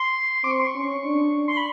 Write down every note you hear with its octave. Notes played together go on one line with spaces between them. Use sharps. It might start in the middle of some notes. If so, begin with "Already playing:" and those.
Already playing: C6
C4 D6
C#6
C6
C#6
C#4
D4
C6
B5